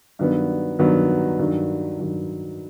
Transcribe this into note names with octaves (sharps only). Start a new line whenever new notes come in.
G2 D#3 F#3 B3
G2 D#3 F#3 B3
G2 D#3 F#3
G2 D#3 F#3